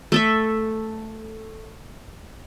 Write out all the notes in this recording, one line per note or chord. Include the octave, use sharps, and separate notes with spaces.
A3 A4 E5